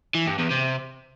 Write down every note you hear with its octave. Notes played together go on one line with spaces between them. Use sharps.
E3
G2
E2
C3